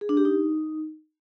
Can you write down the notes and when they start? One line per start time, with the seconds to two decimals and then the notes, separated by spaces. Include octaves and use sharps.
0.01 G#4
0.09 D4
0.17 G4
0.25 D#4